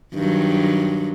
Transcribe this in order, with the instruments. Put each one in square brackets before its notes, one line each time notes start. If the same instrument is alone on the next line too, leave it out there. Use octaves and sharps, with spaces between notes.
[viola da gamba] G2 D#3 F#3